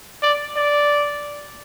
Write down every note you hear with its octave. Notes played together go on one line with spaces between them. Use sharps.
D5
D5